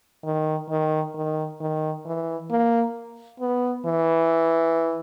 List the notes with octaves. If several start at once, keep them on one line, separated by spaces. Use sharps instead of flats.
D#3
D#3
D#3
D#3
E3
A#3
B3
E3